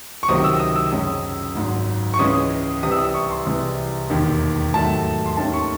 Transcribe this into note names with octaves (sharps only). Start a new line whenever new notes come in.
C#6
C#2 C3 D#3 F#3 C4 D#6
E6
D#6
E6
F#2 C#3 G#3 C#4 D#6
G#1 G#2 F#3
C#6
C#2 C#3 E3 G#3 C#4 D#6
C2 C3 E3 D#6
E6
D#6
C#6
C6
C2 C3 E3 G#3
E1 D#2 D#3
G#2 D#3 F#3 A3 A5
C6
D#2 D#3 A3 C#4 A5
C#6